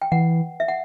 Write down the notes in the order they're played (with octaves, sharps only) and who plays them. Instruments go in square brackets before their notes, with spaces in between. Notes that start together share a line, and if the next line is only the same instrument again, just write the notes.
[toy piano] G5
[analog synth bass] E3 [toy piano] F#5
[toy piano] E5
F#5